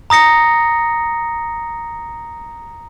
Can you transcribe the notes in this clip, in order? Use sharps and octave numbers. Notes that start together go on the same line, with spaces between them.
A#5 D#6 A#6 C#7